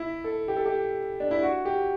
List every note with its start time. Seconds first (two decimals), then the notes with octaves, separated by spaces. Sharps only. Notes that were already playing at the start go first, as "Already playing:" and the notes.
Already playing: E4
0.24 A4
0.48 G4
0.57 A4
0.66 G4
1.20 D4
1.31 E4
1.43 F#4
1.65 G4